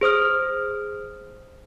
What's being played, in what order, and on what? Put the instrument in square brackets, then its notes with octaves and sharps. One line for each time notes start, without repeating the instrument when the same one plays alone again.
[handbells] G#4 C5 D#6 F6